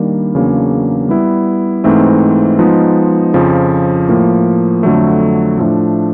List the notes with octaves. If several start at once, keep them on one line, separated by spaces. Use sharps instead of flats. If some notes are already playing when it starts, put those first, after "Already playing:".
Already playing: D#3 G3 A#3 D4
E2 C#3 F#3 A#3 D4
G3 B3 E4
G#2 E3 A3 C4 D#4
F3 G#3 B3 D#4
F2 C#3 F3
A2 F3 A#3
F2 D3 F#3 A3
A2 F3 A3 D4